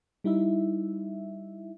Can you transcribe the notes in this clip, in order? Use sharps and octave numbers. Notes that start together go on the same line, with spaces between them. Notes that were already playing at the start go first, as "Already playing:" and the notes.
G3 D#4 E4 E5